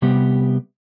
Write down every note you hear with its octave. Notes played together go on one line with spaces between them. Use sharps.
C3 G3 B3 G4